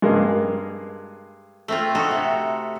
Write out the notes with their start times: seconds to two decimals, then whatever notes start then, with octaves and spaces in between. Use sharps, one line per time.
0.02 G2 G#3 A#3
1.68 A3 C4 F4
1.95 D#4 F#4 A4
2.11 C3